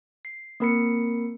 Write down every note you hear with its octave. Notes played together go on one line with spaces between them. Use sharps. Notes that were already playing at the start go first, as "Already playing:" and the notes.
C7
A#3 C4 A#4 B5 C7 C#7